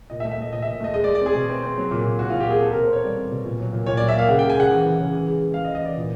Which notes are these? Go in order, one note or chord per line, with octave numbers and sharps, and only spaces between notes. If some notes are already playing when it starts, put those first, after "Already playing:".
A#2 D#5
E5
A3
E5
A3 D#5
A#2 D#5
A#2 E5
A3 D#5
G#3 D#5
D5
G#3
D5
C4 G#4
B2
C4
C4
F#3
A#2
A#2
A#2 F#4
A#2 F4
G4
A#3 G#4
C4 A4
B2 A#4
C5
C4 C#5
G3 D5
C4
B2
A#2
F#3
A#2
A#2 C#5
F#3 D5
E5
A#3 F5
C#3 F#5
G#3 G5
G#5
C#3 F#5
E3
E3
C#3
E3
G#3
G#3
G#3 F5
D#5
E3
D#5
E3 D5
A#2